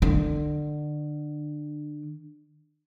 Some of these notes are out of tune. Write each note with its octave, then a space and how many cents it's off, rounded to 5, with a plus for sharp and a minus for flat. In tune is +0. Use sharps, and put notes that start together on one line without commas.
D3 +25